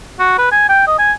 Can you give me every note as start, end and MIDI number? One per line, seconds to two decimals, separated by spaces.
0.20 0.34 66
0.38 0.48 71
0.52 0.66 80
0.69 0.84 79
0.87 0.95 75
0.99 1.12 80